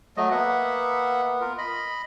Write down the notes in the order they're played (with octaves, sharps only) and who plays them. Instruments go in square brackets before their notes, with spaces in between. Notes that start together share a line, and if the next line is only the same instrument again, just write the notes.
[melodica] F#3 A3 D#5
[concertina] A#3 E5 F#5 [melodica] B3
[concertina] F4 A#4
D#5 B5